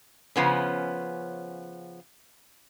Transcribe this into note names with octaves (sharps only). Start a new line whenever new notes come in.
C#3 F3 B3 C#4